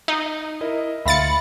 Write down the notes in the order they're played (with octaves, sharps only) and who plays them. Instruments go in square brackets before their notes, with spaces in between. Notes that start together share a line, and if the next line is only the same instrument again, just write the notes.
[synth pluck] D#4
[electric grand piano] E4 A#4 D#5
[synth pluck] D2 A6 C#7 [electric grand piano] E5 F5 C6 [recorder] B5